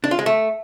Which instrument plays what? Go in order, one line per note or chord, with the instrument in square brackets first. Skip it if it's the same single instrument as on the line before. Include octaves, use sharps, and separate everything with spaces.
[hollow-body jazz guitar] D4
F4
G#3
A3